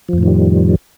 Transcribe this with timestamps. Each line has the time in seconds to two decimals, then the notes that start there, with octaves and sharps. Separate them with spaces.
0.09 F3
0.13 F2
0.18 A2
0.23 D#3
0.27 G3